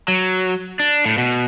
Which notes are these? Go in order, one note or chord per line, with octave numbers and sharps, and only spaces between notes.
F#3
D4
A2
B2